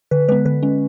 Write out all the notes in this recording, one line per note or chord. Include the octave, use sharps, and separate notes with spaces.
D3 B4
G#3 B3 B4
D3 B4
G#3 C#4